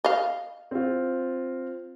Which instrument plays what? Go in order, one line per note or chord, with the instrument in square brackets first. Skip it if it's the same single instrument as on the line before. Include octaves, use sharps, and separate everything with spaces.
[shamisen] D#5 F5
[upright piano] C4 F4